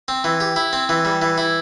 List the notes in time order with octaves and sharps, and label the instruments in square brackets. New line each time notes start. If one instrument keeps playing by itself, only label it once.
[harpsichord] C4
E3
G4
E4
C4
E3
G3
E3
E4